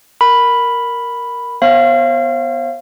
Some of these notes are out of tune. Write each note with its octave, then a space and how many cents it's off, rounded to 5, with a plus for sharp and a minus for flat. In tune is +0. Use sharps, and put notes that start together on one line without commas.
A#4 +0 B5 +0
B3 +0 C5 +45 F5 -30